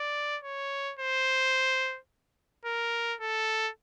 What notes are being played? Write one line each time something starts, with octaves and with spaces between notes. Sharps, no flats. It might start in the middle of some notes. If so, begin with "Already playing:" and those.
Already playing: D5
C#5
C5
A#4
A4